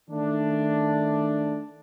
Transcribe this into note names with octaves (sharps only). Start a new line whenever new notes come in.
D#3 A3 D4